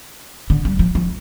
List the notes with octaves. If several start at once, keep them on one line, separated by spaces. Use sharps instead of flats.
D3
G3
F3
F3